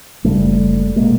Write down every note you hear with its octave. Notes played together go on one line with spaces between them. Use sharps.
F#1 F2 C#3 G3 A3
B2 G#3 A#3